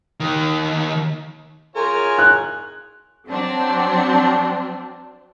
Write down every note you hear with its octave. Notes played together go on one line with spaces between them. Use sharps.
D#2 D#3
F4 G#4 A#4 C#5 G#5
F#6
F#3 C4 D4